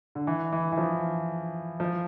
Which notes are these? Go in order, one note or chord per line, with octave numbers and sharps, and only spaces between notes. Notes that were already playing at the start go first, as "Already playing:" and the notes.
D3
E3
E3
E3
F3
F3